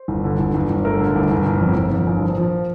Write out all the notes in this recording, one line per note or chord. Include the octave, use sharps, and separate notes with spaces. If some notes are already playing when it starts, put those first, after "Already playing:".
Already playing: C5
G1
D3
G1
G1
G1
A3 A#4
D3
G1
G1
G1
F2
G1
G1
A#1
F3
F3